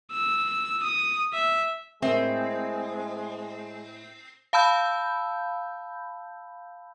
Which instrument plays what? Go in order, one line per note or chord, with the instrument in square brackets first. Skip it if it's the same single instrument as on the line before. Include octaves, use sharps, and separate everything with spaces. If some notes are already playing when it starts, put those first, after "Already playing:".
[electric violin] E6
D#6
E5
[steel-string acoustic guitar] A2 A3 [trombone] G#3 [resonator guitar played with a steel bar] C4 [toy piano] A#4 E5
[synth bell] F5 A5 B5 E6 G6